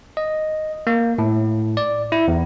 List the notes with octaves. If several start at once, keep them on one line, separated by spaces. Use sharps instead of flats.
D#5
A#3
A2
D5
E4
E2